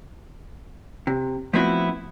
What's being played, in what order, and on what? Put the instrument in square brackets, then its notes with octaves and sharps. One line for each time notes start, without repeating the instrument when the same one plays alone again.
[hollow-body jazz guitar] C3
F3 A3 B3 C4 E4 F#4